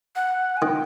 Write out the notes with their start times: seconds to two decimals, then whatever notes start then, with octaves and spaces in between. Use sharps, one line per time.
0.15 F#5
0.57 G#5
0.62 D#3 G5